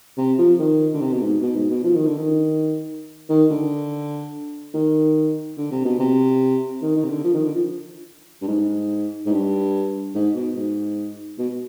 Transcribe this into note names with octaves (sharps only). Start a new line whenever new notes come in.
C3
F3
D#3
D3
C3
B2
G#2
B2
G#2
B2
F3
D#3
D3
D#3
D#3
D3
D#3
D3
C3
B2
C3
D#3
D#3
C3
D3
F3
D#3
D3
F3
G2
G#2
G#2
G2
G#2
B2
G#2
B2